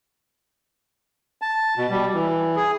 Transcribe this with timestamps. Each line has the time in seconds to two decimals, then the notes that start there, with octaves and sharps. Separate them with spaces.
1.42 A5
1.78 B2
1.90 G3
2.14 E3
2.56 G#4